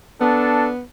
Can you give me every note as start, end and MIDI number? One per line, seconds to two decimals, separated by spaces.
0.21 0.81 59
0.21 0.72 62
0.21 0.70 69